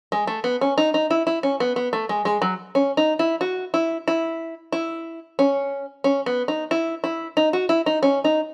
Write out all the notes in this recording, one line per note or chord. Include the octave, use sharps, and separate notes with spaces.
G#3
A3
B3
C#4
D#4
D#4
E4
E4
C#4
B3
B3
A3
G#3
G#3
F#3
C#4
D#4
E4
F#4
E4
E4
E4
C#4
C#4
B3
D#4
E4
E4
D#4
F#4
E4
D#4
C#4
D#4